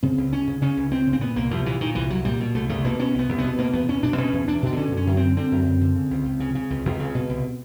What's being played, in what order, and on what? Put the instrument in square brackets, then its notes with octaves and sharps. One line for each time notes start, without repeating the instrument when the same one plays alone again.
[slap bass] C#3 C4
C#2
C#2 C#4
C#3
C#3 C#4
C#2
C#2 C4
C#3
C4
A#2 B3
C2 A#3
C2 F3
A#2 E3
A#2 D#3
C2 E3
C2 F#3
A#2 G3
B2
C2 A3
C2 A3
B2 A#3
B2 C#4
C2 B3
C2
B3
B2
B2 A#3
E2 B3
E2 C#4
B2 D4
B2 C#4
E2
E2 D4
B2 D4
D3 C#4
F#2
C#4
F#2
D3 C4
D3 C4
F#2
F#2
D3
C#3
C#2
C#2
C#3
C#3
C#2
C#2
C#3
B2
C2